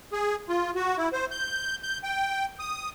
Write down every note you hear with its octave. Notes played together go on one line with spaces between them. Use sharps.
G#4
F4
F#4
E4
C5
G6
G6
G5
D#6